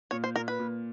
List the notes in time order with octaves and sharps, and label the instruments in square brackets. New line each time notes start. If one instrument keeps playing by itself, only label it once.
[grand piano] A#2 [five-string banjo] C#5
[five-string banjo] C5
[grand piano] A#2 [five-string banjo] A#4
[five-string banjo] B4
[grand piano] A#2